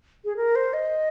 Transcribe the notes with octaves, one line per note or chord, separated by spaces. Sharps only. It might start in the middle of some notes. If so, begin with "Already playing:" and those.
G#4
A#4
C5
D#5